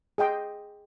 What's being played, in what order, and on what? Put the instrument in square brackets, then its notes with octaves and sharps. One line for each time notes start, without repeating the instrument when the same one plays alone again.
[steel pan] G#4 D#5 G5 C6